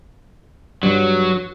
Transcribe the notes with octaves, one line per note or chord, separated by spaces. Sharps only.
G2 F#3